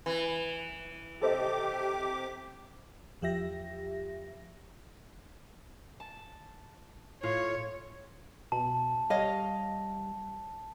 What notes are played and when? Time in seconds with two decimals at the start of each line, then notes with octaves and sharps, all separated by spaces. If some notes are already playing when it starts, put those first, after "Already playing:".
0.06 E3
1.21 C3 G4 A4 C5 D#5 D6
3.22 E2 F3 G4 E5 A#6
6.00 A5
7.23 A2 F4 C#5
8.52 B2 A5
9.10 G3 C#5 D#5 F5